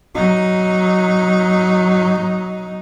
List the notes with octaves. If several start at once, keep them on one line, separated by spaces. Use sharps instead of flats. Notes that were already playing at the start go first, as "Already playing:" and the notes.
F#3 D#4